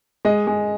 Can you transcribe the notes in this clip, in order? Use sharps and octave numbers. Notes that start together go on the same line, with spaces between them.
G#3 D#5
G#3